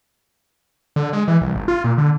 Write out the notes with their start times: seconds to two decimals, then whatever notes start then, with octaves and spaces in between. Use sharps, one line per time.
0.96 D3
1.13 G#3
1.28 E3
1.41 C2
1.55 G#1
1.68 F4
1.84 A#2
1.98 D3